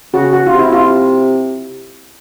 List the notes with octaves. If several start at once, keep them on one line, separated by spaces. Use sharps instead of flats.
C#3 F#4
F#4
F4
C3
E4
F4